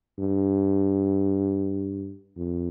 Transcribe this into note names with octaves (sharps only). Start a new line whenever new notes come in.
G2
F2